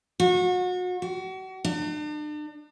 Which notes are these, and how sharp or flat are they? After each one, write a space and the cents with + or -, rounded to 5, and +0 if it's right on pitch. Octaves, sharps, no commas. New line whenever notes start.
F#4 -35
F#4 +35
D4 +40